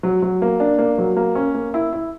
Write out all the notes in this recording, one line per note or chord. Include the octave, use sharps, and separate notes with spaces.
F#3
F#3
A#3
D4
A#3
F#3
A#3
C#4
A#3
E4
E4